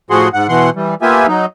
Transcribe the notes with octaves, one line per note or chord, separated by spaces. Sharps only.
A2 F3 F#4 G#4 F#5 C6
G#2 F#5
B2 E3 F#5 C6
E3 G3
A#3 B3 F4 G4 E5 G#5
F#3 D#4